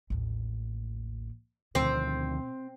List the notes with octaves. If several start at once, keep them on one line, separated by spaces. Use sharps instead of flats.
A1 D#2
D2 B2 D#3 F3 C4